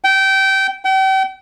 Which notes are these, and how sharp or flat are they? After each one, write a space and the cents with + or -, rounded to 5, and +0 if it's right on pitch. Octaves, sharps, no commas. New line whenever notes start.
G5 -20
G5 -40